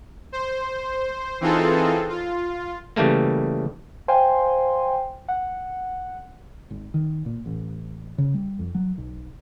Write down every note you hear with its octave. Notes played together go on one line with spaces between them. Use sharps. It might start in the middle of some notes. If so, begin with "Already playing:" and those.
C5
E3 C4 D#4 F4 G#4 A4
F4
C#3 E3 G3 A3 A#3
C5 F5 G5 G#5 C6
F#5
G#1
D#3
A#2
A1
C#3
G3
F2
F#3
B1